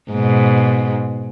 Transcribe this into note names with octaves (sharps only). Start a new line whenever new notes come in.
G#2 B2